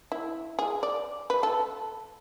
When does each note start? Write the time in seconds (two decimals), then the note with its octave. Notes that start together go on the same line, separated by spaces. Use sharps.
0.12 E4
0.59 G#4
0.83 D5
1.30 B4
1.43 A4